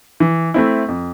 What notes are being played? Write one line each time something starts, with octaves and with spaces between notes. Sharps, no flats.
E3
A3 C4 E4
F2